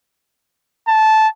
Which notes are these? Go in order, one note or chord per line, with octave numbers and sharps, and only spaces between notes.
A5